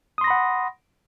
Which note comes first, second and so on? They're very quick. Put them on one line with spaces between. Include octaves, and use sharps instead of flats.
D#6 C6 A#6 B5 F#5